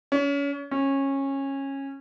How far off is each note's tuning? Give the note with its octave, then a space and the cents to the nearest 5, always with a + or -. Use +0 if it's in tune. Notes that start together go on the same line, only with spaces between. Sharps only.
C#4 +30
C#4 -20